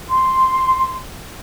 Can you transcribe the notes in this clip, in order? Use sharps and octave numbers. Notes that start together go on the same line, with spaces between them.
C6